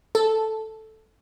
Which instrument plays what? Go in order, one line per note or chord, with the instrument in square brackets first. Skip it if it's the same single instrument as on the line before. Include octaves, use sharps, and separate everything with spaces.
[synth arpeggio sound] A4